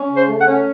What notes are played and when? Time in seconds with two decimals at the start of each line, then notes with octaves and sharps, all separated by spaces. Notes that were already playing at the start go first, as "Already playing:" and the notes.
Already playing: C#4
0.09 C#3
0.15 C5
0.28 A3
0.40 F#5
0.46 C#4